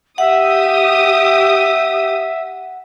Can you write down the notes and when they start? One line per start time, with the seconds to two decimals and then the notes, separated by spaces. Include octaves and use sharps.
0.18 G4 E5 F#5 D#6